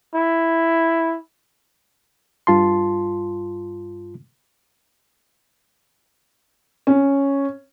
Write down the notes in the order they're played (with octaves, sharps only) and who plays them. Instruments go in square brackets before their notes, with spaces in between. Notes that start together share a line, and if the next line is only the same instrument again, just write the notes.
[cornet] E4
[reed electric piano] G2 F4 A5 C6
[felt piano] C#4